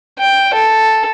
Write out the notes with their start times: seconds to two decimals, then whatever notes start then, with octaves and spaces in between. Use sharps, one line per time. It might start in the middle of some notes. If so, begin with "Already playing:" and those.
0.19 G5
0.55 A4